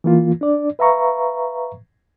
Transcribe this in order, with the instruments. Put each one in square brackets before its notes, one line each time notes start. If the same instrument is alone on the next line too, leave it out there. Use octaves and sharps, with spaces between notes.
[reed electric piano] E3 A#3 F4
D4 D5
B4 E5 F5 A#5 C#6